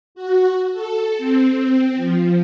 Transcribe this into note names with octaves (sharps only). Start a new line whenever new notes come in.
F#4
A4
C4
F3